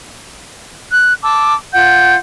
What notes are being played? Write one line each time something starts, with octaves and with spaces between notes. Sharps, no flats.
F#6
A5 D6 E6
F4 F#5 G6